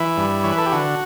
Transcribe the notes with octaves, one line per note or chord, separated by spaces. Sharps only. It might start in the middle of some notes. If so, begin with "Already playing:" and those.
Already playing: E3 E4
G2
E3 C#5
B4
A4
G4
D3 F#4